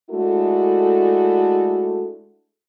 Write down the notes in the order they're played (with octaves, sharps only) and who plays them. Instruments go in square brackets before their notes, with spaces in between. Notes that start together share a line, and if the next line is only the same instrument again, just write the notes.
[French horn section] G#3 A3 D4 E4 F#4 A4